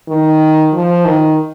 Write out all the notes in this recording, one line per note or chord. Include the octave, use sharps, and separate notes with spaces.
D#3
F3
D#3